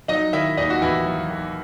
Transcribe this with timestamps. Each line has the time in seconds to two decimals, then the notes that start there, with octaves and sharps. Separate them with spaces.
0.08 F#3 D#4 D#5
0.33 D#3 E4 E5
0.57 D#2 D#4 D#5
0.70 F#4
0.81 D#2 E3 E4
1.06 F#3
1.30 D#3